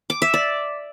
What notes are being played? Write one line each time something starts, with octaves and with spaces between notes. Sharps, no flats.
D6
E5
D5